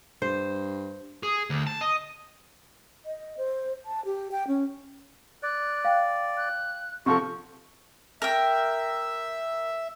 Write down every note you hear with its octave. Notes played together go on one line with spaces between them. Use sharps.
G2 C5
G#4
D2
A5
D#5
D#5
C5
A5
G4
G5
C#4
D5 F#6
F5 G5
F#6
C3 F3 F4 F#4 A4 C#6
A#4 E5 G5